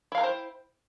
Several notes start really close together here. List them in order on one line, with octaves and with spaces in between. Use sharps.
E4 F5 A#4 G5 C5